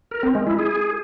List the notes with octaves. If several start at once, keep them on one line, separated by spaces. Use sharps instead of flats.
A#4
C4
G#3
E4
G#4